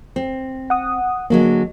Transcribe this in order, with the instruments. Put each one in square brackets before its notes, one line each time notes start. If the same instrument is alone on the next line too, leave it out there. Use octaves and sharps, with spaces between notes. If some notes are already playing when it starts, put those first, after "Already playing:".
[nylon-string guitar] C4
[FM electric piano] F#5 D#6
[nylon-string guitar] D3 F#3 G#3 [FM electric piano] A#3